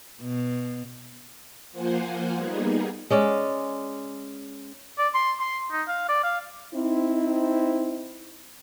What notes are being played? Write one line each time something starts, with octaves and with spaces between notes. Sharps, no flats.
B2
F3 A#3 F4 C5 F#5 G#5
G3 A#3 B3 D#4 G#4
G#3 C#4 D5
D5
C6
C6
D#4
F5
D5
F5
C4 D#4 E4